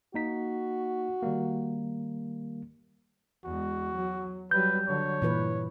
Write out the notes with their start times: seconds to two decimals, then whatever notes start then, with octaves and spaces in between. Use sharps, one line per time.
0.14 A#3 D#4 F#4 B6
1.23 D#3 G3 A#3
3.45 E2 G#3 F#4
3.93 F#3
4.51 F#3 G3 B4 G6
4.88 D3 F#3 C#5
5.22 G2 A#2 E3 B4